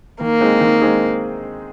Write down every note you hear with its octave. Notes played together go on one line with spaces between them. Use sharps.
D#3 A#3
G#3 C4 D#4 G#4
D#3
G#3 C4 D#4 G#4